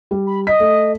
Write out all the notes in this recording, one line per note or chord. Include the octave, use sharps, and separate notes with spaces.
G3
B5
D#5 B6
A3